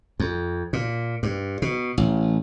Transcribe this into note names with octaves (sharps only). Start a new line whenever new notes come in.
F2
A#2
G2
B2
A1